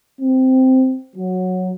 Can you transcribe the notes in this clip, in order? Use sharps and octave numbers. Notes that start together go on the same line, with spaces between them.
C4
F#3